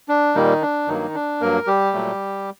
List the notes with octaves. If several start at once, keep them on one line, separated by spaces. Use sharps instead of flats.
D4
A#2 D#3 G3 A#3 D#4
D4
G2 D#3 F#3 A#3 D#4
D4
G2 F#3 A#3 A#4
G3 G4
A#2 F#3 A3